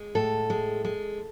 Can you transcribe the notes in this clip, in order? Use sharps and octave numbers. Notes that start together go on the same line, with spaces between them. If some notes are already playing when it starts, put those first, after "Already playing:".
Already playing: G#3
A2 A4
G#3
G#3